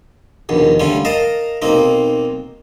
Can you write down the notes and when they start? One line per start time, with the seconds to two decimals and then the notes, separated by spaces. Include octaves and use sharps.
0.49 A#1 D#2 B2
0.80 D3 G3 A3 C#4 F4
1.05 A#4 D#5 F5 A5
1.62 B1 A#3 C4 D#4